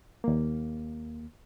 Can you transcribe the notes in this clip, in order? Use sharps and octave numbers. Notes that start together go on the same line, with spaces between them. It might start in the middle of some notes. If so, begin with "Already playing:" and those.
D#2 A#3